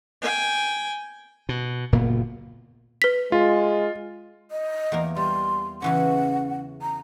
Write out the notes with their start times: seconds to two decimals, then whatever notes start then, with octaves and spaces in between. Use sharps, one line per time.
0.22 G5 G#5
1.49 B2
1.92 F#1 A#2 A#3 B3
3.02 B4 B6
3.32 G#3 F4
4.51 D#5
4.92 E2 A#3 A#4
5.16 G3 C6
5.82 C#3 E3 C#4 F#5
6.82 A#5